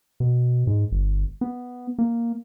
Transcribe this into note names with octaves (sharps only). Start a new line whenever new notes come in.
B2
G#2
G1
B3
A#3